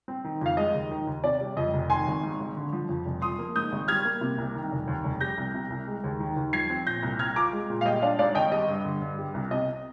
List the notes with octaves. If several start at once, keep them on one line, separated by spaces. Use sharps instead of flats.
C4
D#3
F2 F5
G#3 D#5
D#2
D#3
D#2
C3 D5
G3
F2 D#5
F1
D#3 G#5 C6
G#1
G#2
G#1
D3
F3
F2
F1
F3 C6 D#6
A#3
G#2 D#6 G6
G#1
G3 F6 G#6
A#3
C3
C2
D#3
F1
D#2
F1
G3 G6 A#6
C2
C3
C2
G#3
D#2
D#3
D#2
F3 G#6 C7
C4
A#2 G6 A#6
C2
C4 F6 G#6
F4 A#5 D6
G#3
A#2
F5
G3 D#5 G5
D4 D5 F5
G#2 D5 F5
G#1 D#5 G5
G3 D#5
G2
D3
G2
G3
C2
C3 D#5